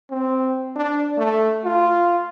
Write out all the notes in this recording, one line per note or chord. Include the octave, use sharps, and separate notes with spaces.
C4
D4
A3
F4